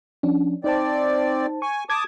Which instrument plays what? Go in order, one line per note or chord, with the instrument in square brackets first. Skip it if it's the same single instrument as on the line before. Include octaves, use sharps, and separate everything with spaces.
[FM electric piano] F3 C#4 D4
[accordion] C4 D5 [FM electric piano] D#4 C5 A5
[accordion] G#5 [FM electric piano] C#6
[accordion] A5 D6 D#6 [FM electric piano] G#6